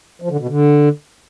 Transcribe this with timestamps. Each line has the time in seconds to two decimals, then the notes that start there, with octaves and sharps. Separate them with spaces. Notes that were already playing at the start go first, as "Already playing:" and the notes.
0.22 F3
0.31 D3
0.39 B2
0.48 D3